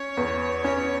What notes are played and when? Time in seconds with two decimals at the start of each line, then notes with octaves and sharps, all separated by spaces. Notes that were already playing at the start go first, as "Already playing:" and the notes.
Already playing: C#4 C#5
0.17 E2
0.64 C#4 C#5